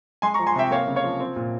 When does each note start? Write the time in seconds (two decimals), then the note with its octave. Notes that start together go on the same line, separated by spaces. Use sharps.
0.22 G#3 G#5 C6
0.34 A#5 C#6
0.39 F3
0.47 G#5 C6
0.56 C3 E5 G5
0.71 A#3 C#5 F5
0.88 C#3
0.96 C#5 F5
1.04 F3
1.20 C4
1.36 A#2